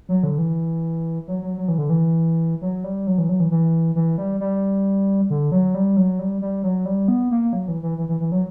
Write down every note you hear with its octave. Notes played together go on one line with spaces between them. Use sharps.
F#3
D3
E3
F#3
F#3
F#3
E3
D3
E3
F#3
G3
F#3
E3
F#3
E3
E3
E3
G3
G3
D3
F#3
G3
F#3
G3
G3
F#3
G3
B3
A#3
F#3
E3
E3
E3
E3
E3
F#3